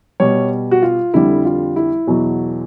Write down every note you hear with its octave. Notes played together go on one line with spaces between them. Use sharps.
B2 G3 C#5
F#4
F4
F2 D3 G3 E4
F4
E4
E2 B2 F#3